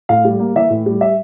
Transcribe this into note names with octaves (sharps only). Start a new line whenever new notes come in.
A2 F5
G3
A#3
E3 E5
A2
G3
E5